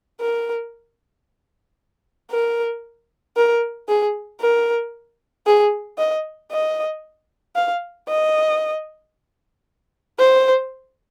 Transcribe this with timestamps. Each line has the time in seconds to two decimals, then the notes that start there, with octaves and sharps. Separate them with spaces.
0.20 A#4
2.31 A#4
3.36 A#4
3.88 G#4
4.41 A#4
5.46 G#4
5.98 D#5
6.51 D#5
7.55 F5
8.08 D#5
10.19 C5